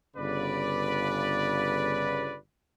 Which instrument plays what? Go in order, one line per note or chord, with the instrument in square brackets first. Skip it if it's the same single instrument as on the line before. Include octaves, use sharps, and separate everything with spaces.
[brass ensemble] G1 C#3 B4 D5